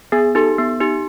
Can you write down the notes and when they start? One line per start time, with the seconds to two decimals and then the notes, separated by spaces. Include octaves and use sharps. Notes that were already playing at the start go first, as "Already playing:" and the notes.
0.12 B3 G#4
0.35 D#4 G4 A4
0.58 B3
0.80 D#4 G4